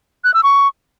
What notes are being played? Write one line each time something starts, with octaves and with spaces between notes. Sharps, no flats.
F#6
E6
C#6